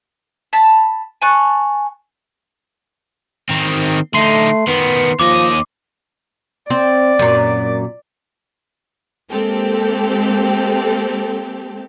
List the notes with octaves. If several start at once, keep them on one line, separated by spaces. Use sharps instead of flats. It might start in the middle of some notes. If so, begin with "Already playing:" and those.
A5 B5
G#5 A5 C#6 F#6
D#3 C4
D3 A3 D#4 C6 C7
D#3 B3 B4
D#2 F3 D#5 D6
C4 D5
F#2 A#2
G#3 A#3 C4 G4 A4